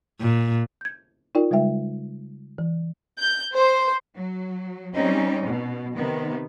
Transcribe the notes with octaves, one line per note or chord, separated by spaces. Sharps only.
A#2
G6 G#6
D#4 F4 A#4 D5 G5
C#3 G3 G#3 E5 G5
E3
G6
C5
F#3
G3 G#3 C4 C#4 D#4
B2
C3 D#3 B3